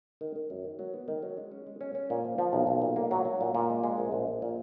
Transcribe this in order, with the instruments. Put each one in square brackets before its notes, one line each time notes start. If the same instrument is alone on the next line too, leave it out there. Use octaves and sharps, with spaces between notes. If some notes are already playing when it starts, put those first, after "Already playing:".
[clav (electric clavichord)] D#3
D#3
F#2
D#3
F#3
B3
D#3
F#3
G#3
C#4
G#3
C#4
C#4
A#2
F3
F3
B1
B1
A#2
A#3
F#3
F#3
A#2
A#2
G#3
G#3
A#1
A#1
A#1
A#2